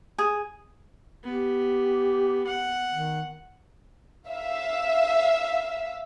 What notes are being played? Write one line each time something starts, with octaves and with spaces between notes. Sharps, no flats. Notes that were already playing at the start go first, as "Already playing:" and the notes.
G#4
B3 G4
F#5
D#3
E5 F5